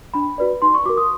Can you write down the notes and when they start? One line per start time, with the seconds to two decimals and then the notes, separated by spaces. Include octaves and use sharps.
0.14 D4 B5
0.38 F#4 B4 D5
0.62 D#4 C6
0.74 C#6
0.85 F#4 A#4 D6
0.97 D#6